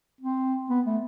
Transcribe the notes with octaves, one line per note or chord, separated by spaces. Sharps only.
C4
B3
A3